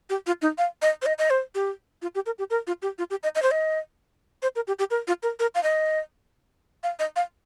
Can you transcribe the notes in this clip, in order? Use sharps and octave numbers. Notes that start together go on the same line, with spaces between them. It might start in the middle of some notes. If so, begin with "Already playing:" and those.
G4
F4
D#4
F5
D#5
C5
D#5
D#5
C5
G4
F4
G4
A#4
G4
A#4
F4
G4
F4
G4
D#5
D#5
C5
D#5
C5
A#4
G4
G4
A#4
F4
A#4
A#4
F5
D#5
F5
D#5
F5